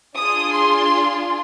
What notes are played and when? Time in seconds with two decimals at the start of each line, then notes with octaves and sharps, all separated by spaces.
0.17 D4 F4 G#4 D#6
0.52 C6